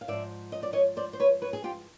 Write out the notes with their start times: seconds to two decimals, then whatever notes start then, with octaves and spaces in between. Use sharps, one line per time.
0.01 F5
0.08 G#2 F3 D5 E5
0.52 D#5
0.63 D5
0.73 C#5 D#5
0.97 C5 D5
1.13 C5
1.20 B4 C#5
1.42 B4 C#5
1.53 G#4
1.64 F4 G4